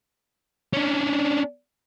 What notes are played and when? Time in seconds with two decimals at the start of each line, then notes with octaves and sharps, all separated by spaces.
0.73 C#4 D4